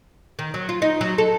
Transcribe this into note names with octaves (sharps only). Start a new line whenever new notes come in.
D#3
F#3
F4
D#4
F#3
A4